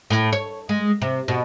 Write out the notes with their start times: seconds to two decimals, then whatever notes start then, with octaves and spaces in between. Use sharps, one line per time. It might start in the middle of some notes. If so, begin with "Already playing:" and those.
0.10 A2
0.33 C#5
0.69 G#3
1.02 C3
1.28 B2